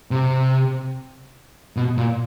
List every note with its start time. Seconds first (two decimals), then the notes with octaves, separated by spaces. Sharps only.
0.11 C3
1.77 B2
1.98 A#2